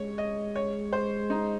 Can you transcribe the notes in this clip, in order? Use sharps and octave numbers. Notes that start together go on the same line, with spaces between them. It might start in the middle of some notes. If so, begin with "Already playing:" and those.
Already playing: G#3 C#5
D#5
C#5
C5
D#4